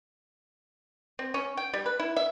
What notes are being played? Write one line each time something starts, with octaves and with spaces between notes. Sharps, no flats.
C4
C#4
G5
G3
B4
E4
E5